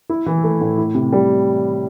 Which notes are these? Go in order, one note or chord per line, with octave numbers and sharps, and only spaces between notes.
E4
E3
A3
A2
E4
C3
G3